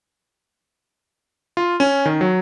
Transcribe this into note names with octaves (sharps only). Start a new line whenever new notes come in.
F4
C#4
D#3
F#3